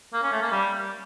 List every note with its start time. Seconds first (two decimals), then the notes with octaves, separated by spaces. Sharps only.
0.13 A#3
0.23 C#4
0.32 A3
0.42 A#3
0.51 G3